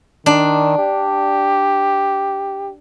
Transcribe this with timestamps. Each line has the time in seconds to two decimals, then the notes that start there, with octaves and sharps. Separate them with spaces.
0.26 D#3 D4
0.79 G4